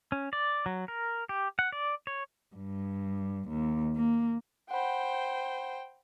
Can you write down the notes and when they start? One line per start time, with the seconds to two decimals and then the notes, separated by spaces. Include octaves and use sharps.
0.12 C#4
0.33 D5
0.66 F#3
0.88 A#4
1.29 G4
1.59 F#5
1.72 D5
2.07 C#5
2.56 G2
3.49 D#2
3.95 A#3
4.71 C5 F#5 G5 B5